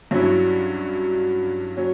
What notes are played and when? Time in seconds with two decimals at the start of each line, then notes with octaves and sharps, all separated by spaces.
0.11 G2 F#3 C#4 E4
1.77 F#3 C#4